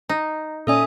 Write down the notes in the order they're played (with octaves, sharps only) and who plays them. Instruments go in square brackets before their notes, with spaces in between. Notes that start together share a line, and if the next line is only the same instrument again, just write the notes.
[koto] D#4
[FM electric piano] A#2 C#4 D5 [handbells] A4 E5 G#5 [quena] D#6